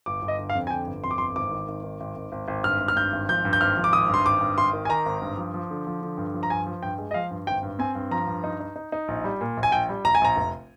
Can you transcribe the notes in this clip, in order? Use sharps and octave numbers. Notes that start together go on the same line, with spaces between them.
G1 D6
G1
D#5
D3
F5
F2
G#5
D3 G5
G1
F2 C6
D6
G1 C6
G#1 D6
D#3
G#1
D#3
G#1
G#1
G#1
G#1
G2 F6
G#1
F6
G2 G6
G#1
F3 G6
G2
G6
G#1 F6
F3
D6
G#1 D#6
G2 C6
G#1 D6
G2
G#1 C6
D#3
G#5
D#3 A#5
G#1
G2
F3
F3
D3
F3
D3
G2
F3
A#5
G2 G#5
F3
G2 G5
G#3
D#5
F3 F5
G2
G#1 G5
G2
C4 G#5
G2
F3 A#5
G2
D#4
D#4
D#4
D#4
A#1
G3
A#2
A#1
G#5
A#1 G5
G3
A#1 A#5
G#5
A#1 A#5
F1